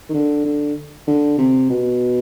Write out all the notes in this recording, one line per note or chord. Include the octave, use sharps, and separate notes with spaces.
D#3
D3
D3
D3
C3
B2